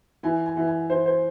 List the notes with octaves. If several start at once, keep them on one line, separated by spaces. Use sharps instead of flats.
E3 G#5
G#5
E3
G#5
E3 C5
C5